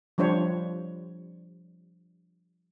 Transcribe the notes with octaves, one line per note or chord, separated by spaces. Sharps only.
F3 G3 D4 C5 C#5